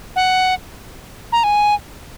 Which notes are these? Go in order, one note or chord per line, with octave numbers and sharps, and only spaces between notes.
F#5
A#5
G#5